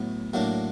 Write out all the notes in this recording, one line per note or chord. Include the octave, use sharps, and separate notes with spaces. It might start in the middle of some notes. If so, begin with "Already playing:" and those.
Already playing: A2 F#3 B3
A2 F#3 A#3 D4